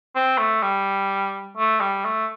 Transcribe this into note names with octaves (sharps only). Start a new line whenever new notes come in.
C4
A3
G3
A3
G3
A3